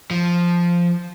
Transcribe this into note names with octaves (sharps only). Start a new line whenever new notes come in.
F3